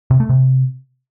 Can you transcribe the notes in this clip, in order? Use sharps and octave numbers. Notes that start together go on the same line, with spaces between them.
C3
A3
C3